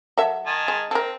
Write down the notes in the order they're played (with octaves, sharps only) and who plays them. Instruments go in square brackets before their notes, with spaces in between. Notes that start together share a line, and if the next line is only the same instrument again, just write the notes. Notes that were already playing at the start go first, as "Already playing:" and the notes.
[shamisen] F#3 A4 E5
[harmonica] D#3 G#5 A5
[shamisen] G#3
[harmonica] C4 [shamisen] A4 A#4